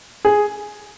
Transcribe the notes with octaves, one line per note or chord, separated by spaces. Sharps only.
G#4